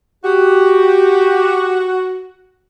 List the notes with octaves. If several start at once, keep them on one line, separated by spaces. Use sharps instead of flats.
F#4 G4